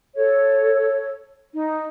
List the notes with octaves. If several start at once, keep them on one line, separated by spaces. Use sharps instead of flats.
A4 C#5
D#4